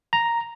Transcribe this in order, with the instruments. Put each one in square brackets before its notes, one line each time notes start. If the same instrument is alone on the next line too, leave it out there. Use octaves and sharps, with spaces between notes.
[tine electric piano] A#5